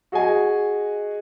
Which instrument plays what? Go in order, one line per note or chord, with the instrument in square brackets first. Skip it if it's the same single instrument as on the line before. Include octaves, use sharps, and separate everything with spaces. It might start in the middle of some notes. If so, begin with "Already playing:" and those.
[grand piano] F#4 G#4 D#5 G#5